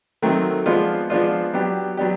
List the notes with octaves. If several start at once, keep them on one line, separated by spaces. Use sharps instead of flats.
D#3 F#3 A3 C4
F3 G#3 B3 D4 F4
F3 G#3 B3 D4 F4
F#3 B3 D4 G4
F#3 B3 D4 G4